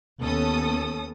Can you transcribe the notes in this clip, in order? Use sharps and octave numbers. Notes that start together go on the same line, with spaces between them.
D#2 B3 C#4 A4 D#6